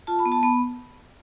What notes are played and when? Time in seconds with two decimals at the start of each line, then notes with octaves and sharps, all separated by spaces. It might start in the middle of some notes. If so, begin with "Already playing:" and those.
0.07 F4 A5
0.19 B5
0.25 B3
0.32 A5
0.43 B3 B5